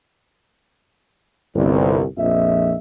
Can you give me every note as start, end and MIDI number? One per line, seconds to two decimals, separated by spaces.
1.55 2.04 31
1.55 2.04 36
2.17 2.75 34
2.17 2.75 41
2.17 2.75 75
2.17 2.75 76